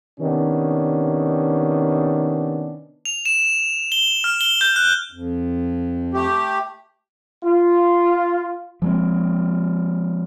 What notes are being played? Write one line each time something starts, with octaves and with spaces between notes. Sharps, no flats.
C3 D#3 B3 C#4 D4
F7
E7
G7
F6
G7
G6
F#6
F2
A3 G4
F4
F3 G#3 C4